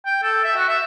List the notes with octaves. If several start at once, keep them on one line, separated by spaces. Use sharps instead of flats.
G5
A4
E5
F#4
E5